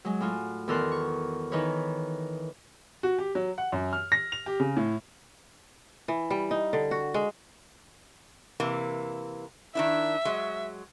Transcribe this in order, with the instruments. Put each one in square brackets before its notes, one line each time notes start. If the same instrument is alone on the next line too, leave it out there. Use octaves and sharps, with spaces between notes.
[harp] F#3 G#3
A2 F4 F#4
E2 D#3 A4 A#4 C6 F#6
C#6
D#3 E3 D#4 B4 C#5
[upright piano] F#4
G4
F#3
F#5
F#2
F6
A#6
F7
G4
C#3
A2
[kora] E3
G3
D#4
D3
F#4
G#3
[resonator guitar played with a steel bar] C3 E3 A#3
[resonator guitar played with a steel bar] D#3 D4 E4 [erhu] E5
[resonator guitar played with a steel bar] F#3 G#3